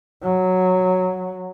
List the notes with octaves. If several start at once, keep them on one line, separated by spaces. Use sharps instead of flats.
F#3